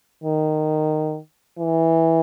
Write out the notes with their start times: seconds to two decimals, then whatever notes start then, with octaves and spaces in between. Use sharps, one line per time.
0.24 D#3
1.59 E3